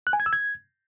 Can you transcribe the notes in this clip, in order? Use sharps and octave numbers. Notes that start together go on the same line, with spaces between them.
F#6
G#5
G#6
E6
G#6